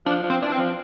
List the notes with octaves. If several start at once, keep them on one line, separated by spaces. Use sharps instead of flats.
F3 D4
F3
C4
E3 D4
C4
F3